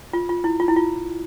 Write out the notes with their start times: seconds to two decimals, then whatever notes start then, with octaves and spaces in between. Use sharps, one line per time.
0.13 F4
0.29 F4
0.44 E4
0.60 F4
0.68 E4
0.76 F4